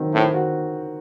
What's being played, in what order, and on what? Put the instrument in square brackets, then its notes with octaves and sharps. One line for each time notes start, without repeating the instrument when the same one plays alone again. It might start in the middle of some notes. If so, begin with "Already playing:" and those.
Already playing: [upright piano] D#3 F#3 C4
[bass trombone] A2 [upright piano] C4
[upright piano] F#4